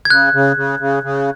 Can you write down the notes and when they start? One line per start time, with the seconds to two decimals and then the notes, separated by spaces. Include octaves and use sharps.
0.05 G#6
0.10 C#3 F#6
0.33 C#3
0.56 C#3
0.79 C#3
1.03 C#3